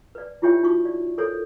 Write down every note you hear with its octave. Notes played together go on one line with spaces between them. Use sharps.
B4 D5
E4 F4 G4 C#5 E5 G5
D#4 F#4 C#6
D5
A4 A#4 C5 C#5